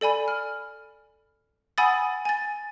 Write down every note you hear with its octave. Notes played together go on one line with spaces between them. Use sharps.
A4 D5 G#5 B5
F6
F#5 G#5 B5 D#6 E6 A6
G#5 A6